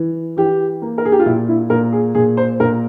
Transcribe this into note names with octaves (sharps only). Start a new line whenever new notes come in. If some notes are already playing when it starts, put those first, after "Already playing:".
Already playing: E3
E3 G4
A#3
A#4
G#4
G4
F4
A#2 E4
E4
A#2 A#4
G#4
A#2 G#4
C5
A#2 A#4